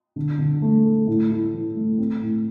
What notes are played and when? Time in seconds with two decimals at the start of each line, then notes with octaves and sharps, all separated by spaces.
0.16 D3
0.39 D3
0.62 A3
0.84 A4
1.07 A2
1.30 E4
1.53 E3
1.76 A3
1.98 C4
2.21 A2